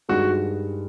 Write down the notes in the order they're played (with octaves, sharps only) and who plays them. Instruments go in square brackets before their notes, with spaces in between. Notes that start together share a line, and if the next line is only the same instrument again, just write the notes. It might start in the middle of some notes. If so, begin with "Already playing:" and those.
[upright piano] G2 D#3 G#3 [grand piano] F#4